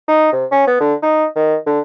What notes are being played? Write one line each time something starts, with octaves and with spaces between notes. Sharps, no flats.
D#4
C3
C#4
B3
D3
D#4
D#3
D3